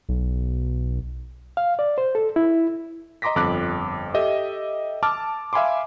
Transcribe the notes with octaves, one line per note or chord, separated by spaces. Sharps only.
B1
F5
D5
C5
A4
E4
D#5 A#5 C6 D6 A#6 B6
G1 F2 D6 F#6
G4 A4 D#5 E5
A5 D6 E6 F6
E5 F5 G#5 B5 C6 D6